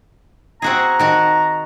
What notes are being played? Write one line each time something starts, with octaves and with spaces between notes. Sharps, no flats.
C4 F#4 G#4 A#5
D#3 F#4 A5